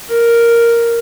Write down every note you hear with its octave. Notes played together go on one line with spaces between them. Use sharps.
A#4